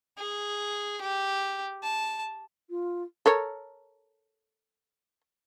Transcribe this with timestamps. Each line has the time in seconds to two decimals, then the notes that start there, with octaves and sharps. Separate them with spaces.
0.19 G#4
1.01 G4
1.83 A5
2.70 F4
3.26 A4 A#4 C#5